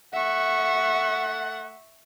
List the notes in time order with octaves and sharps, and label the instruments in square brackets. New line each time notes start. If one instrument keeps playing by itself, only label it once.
[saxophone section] A3 F#5 [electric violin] E5 C#6